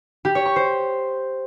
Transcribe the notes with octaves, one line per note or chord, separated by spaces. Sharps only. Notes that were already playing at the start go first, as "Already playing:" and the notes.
G4
C#5
C#6
C5